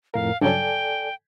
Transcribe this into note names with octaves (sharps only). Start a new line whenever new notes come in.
F2 A2 A#4 F5
G2 C#3 F#3 A4 D5 G5 G#5